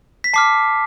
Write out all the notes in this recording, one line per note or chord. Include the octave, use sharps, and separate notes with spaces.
B6
A5 D6 F6 C7